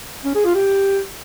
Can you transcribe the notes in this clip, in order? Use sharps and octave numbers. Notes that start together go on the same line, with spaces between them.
C#4
G#4
F4
G4